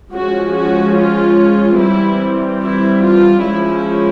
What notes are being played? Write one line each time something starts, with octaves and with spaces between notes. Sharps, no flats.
F3 G#3 C#4 F#4
F#4
F4
E3 G3 C4 E4
E4
F4
F3 G#3 C#4 E4